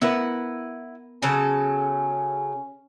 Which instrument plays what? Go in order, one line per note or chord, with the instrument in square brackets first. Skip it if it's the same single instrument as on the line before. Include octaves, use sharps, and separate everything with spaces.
[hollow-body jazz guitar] B3 A#4 B4 [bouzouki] E4 F#5
[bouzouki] C#3 F#3 A4 [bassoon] C#4